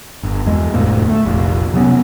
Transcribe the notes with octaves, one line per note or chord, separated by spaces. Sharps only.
G1
E2 G#3
F1 D2 A2 A#3
A3
F1 A#1 A#2
C3 F#3 B3 C#4